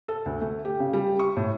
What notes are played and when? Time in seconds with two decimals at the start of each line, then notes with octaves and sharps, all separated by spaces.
0.08 A4
0.25 D2
0.41 A3
0.65 G4
0.80 C#3
0.93 G3
1.19 C#6
1.36 A2